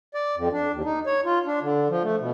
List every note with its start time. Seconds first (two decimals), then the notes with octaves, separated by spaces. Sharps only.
0.14 D5
0.37 F2
0.53 D4
0.73 D#2
0.84 D#4
1.06 C#5
1.26 F4
1.46 D4
1.62 D3
1.90 F3
2.04 A3
2.20 B2